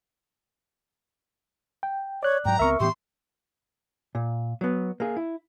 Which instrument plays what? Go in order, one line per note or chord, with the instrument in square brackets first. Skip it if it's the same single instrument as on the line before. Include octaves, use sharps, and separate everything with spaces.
[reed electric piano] G5
[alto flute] C#5 [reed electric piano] D5 F#6
[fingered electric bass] G#2 F#3 [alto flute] G5 [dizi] A#5
[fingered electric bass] C#2 B3 C4 [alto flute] A#4 [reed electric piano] E5 C#6
[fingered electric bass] A2 E3 B3 [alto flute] G4 [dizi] C6
[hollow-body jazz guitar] A#2
F#3 B3
A#3 G#4
E4